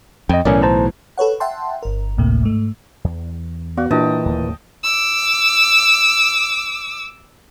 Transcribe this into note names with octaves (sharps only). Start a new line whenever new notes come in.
F2 D#5 G5
B1 A2 E3 C#4 A#4 D5
C5 A5 A#5
A4 B4 C#5 F#5
E5 F#5 G5 A5 C6
G1 A#4
G#1 D2 A2 C3 A#3
G#2 A3
E2
B3 F#4 D5 F5
A#2 E3 D4 D#5 G5 A5
D1 D#2 A#3
D6 E6